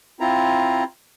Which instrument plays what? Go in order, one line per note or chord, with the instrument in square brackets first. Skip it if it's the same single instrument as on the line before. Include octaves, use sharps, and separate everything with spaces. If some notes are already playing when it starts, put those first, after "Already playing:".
[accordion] C4 E4 F4 A#5